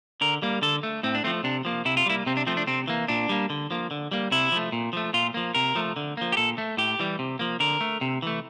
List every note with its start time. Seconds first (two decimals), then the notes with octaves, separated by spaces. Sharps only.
0.21 D3 A#4
0.42 G3 A#3
0.62 D3 A4
0.83 A3
1.03 A2 C4
1.15 D4
1.24 F3 A3 C4
1.44 C3 D4
1.65 F3 A#3
1.85 C3 E4
1.97 F4
2.06 G3 A#3 E4
2.26 C3 C4
2.37 D4
2.47 F3 A3 C4
2.57 D4
2.67 C3 C4
2.88 E3 A#3
3.08 A#2 D4
3.29 G3 A#3
3.50 D3
3.71 F3 A#3
3.91 D3
4.12 G3 A#3
4.32 C3 E4
4.52 F3 A3
4.72 A#2
4.93 F3 A3
5.13 A#2 F4
5.34 F3 A#3
5.55 C3 A#4
5.75 F3 A3
5.96 D3
6.17 F3 A#3
6.32 G4
6.37 A#2 A4
6.58 A3
6.77 A2 G4
6.99 E3 G3
7.19 C3
7.39 F3 A#3
7.60 D3 A#4
7.81 A3
8.01 C3
8.22 E3 A3